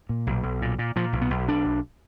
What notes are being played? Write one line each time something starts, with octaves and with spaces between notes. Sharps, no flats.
A#2
B1
B1
A#2
A#2
A#2 F3
B1
B3
B1
B1 D4
B1